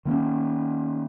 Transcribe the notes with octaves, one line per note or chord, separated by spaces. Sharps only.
D#3 A#3 B3 C#4